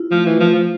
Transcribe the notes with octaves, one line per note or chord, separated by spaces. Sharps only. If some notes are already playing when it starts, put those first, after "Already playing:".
Already playing: E4 F4
F3 A3
E3
F3
F3